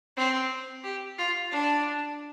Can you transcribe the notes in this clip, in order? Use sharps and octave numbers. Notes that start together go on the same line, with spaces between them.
C4
G4
F4
D4